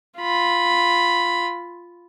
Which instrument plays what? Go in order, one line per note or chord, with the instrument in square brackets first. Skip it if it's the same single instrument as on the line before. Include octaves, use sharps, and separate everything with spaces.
[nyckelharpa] F4 B5